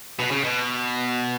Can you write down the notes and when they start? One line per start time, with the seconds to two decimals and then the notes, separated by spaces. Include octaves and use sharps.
0.19 B2
0.31 C#3
0.44 B2